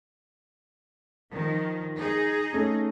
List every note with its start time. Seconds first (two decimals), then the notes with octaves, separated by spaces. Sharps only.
1.31 D#3 F3
1.95 D#4 G#4
2.53 A3 C#4